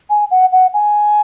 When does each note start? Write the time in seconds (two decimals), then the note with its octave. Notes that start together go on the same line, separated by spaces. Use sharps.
0.09 G#5
0.30 F#5
0.52 F#5
0.73 G#5